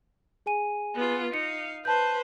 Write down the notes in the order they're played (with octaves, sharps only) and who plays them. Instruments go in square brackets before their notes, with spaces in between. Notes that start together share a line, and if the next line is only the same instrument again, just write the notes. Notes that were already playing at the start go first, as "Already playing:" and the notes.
[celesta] G#4 G#5 D#7
[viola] B3 F4
[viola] D#4 F5 [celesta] C#7
[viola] B4 C5 [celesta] A5 G6